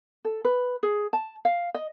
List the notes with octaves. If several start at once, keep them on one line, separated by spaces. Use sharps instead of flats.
A4
B4
G#4
A5
F5
D#5